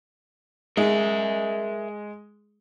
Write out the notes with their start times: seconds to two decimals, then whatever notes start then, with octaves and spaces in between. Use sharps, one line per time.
0.77 G#3 A#4 E5